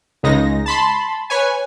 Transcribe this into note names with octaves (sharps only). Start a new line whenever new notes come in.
C#2 C#3 G#3 D#4 A#6
A5 B5 C6
B4 C#5 G#5